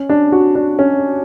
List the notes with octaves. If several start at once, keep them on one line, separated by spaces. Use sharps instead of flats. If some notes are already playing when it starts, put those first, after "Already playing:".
Already playing: C#4
D4
F#4
D4
C#4